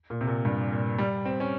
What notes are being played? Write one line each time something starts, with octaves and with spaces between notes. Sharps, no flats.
A#2
C3
A#2
G2
A#2
G3
C4
C#4